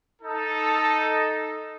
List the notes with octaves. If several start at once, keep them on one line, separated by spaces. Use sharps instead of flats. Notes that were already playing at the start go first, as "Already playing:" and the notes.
D#4 A4